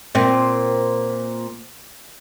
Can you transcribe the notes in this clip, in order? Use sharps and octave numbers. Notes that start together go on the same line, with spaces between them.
A#2 C4